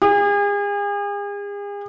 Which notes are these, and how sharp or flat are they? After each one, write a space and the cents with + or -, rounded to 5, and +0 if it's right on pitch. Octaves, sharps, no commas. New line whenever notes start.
G#4 -40